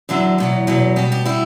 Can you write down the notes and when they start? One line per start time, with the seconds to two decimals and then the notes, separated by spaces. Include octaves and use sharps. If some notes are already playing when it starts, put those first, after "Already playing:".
0.09 E2 D3 F#3 E5
0.38 E2 B2 F#3
0.67 E2 B2 F#3
0.96 B2 G3 G4
1.12 G4
1.25 B2 G3 E4